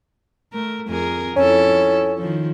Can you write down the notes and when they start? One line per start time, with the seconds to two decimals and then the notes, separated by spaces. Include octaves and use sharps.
0.53 A3 A#4
0.87 F2 G#4 A#4
1.36 F2 C#4 E4 A4
2.18 D#3 F3